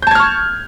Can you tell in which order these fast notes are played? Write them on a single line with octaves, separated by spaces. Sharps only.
G6 A5 G#6 F6 C#6